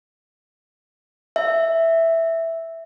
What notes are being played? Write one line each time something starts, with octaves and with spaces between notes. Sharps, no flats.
E5